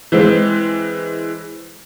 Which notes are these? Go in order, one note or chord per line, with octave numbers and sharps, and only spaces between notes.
E3 G#3 C4